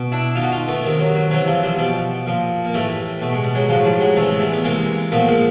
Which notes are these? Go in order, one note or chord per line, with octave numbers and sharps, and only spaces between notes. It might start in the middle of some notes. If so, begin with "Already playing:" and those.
Already playing: B2
D4 E4
B2 D#4 F4
F#4
D#4 F4
A3 B3
C3 D#3
F#3
F#3
C3 E3 F#3
F3 G3
F3 G3
B2 F3 G3
A#2 F3
A#3
A2 E3 G3 A3
B2 A3
G#3
G3
F#3 G#3
A2 F3 F#3 G#3
F3 G3
F#3 G#3
C3 E3 A3
G#3
G3 A3
B3
C3 E3 G#3 A#3
A#2 F3 A3 B3
G#3 A#3